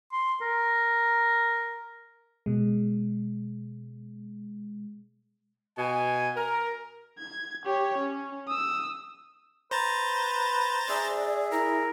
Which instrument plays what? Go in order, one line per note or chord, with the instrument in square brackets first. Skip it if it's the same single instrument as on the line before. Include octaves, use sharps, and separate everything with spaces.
[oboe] C6
A#4
[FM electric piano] B2 G#3
[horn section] B2 G#5
A#4
[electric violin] G#6
G4 C#5
C#4
D#6 E6
[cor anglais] B4 [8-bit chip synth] C5 A#5 A6
[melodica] G#4 E5 [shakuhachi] D5
[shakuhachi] E4 [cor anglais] A#4